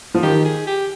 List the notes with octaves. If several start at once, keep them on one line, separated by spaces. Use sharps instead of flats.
F3
D#3 G4
G#4
G4